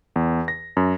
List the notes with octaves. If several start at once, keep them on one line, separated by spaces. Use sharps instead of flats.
E2
A#6
F#2